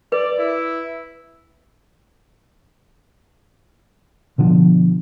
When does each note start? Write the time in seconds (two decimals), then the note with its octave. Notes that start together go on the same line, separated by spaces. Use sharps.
0.12 B4 D5
0.38 E4
4.38 B2 D3 F3